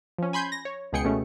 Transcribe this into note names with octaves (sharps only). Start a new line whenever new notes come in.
F3 C#4
G#5 B5 C6 G6 G#6
A#6
C#5
C#2 B2 G#4 G5 C#7
B2 A3 C#4